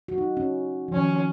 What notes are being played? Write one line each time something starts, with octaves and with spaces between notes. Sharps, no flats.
F#4
D#4
C#4
F3
D#3 C#4